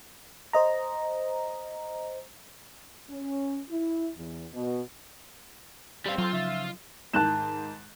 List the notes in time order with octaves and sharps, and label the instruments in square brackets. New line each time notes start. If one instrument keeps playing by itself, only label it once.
[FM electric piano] C5 D#5 A#5
[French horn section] C#4
E4
E2
B2
[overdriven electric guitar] G3 F5 [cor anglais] C4
[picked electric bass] F#3 [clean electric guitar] E4 A4 C5 [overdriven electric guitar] F4
[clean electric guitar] C#3 F3 D#4 [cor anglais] E5
[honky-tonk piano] G#2 D#3 G6 [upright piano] A5 F#6 E7